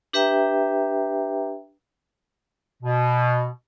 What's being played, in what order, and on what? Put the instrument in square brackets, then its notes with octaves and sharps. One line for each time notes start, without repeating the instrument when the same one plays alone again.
[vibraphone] D4 G4 B4 E5 G5 A#5
[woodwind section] B2